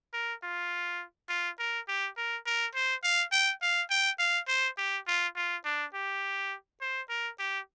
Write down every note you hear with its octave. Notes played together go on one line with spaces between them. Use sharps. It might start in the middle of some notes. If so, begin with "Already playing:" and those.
A#4
F4
F4
A#4
G4
A#4
A#4
C5
F5
G5
F5
G5
F5
C5
G4
F4
F4
D4
G4
C5
A#4
G4